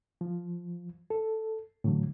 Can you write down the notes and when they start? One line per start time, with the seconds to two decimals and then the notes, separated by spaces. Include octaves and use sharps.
0.21 F3
1.10 A4
1.84 A2 D3 E3 F#3 A3